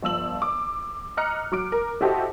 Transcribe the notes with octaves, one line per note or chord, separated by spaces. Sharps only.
G1 F3 E6 F#7
D6
D#5 A#5 F6 F#6 C#7
F#3 D6 D7
A#4
E4 F#4 G4 A4 C5 D#5